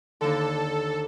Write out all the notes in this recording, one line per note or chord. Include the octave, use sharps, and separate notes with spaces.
D#2 D3 A4